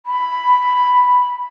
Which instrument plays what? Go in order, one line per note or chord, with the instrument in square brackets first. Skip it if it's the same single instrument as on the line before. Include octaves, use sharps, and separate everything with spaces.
[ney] B5